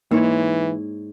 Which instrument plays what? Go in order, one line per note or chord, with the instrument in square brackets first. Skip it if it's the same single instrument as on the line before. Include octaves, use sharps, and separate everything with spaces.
[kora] G#2 E4 C#5 [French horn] E3 [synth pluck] A#3